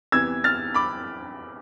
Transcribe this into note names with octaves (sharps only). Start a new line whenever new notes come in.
E2 C3 E3 E6 G#6
F6 A6
B5 D6